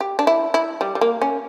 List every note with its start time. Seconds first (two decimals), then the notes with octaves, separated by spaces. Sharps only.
0.01 G4
0.19 D4
0.27 E4
0.54 E4
0.81 G3
0.95 G3
1.01 A#3
1.22 C#4